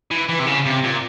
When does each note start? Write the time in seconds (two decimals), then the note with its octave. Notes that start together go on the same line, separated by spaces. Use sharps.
0.11 E3
0.29 E3
0.39 C3
0.46 C#3
0.65 C3
0.84 A#2